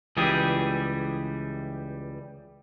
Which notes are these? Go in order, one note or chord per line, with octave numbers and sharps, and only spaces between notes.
C#2 E3 G3 G4 G#4